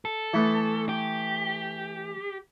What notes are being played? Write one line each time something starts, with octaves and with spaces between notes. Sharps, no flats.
A4
E3 A3 B3
G4